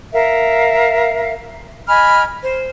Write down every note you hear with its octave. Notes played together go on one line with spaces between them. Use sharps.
A#4 E5 F5
D#5 G#5 B5 F6
C5